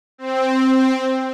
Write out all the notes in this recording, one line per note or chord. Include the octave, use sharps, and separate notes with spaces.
C4